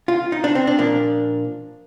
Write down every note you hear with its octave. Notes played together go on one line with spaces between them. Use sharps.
F4
D#4
D4
C4
D4
A#2 F3 A#3 D4